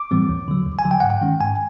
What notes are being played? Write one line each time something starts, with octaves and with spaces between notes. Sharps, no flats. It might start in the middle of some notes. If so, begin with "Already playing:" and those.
Already playing: D6
A2 E3 G3 C4
D#2
D3 F#3
D#2
G#5
D3 F#3
G5
G#2 F#5
G5
D#3 G#3 C#4
G#2 G#5